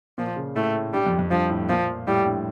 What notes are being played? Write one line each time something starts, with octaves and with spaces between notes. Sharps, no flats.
A#2 F3
C#3
A2 A3
G2 G3
F2
F2
G2 F3
A2
A#2 F3
A2 G3
G2